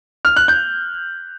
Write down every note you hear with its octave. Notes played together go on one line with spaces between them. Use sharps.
F6
F#6
G6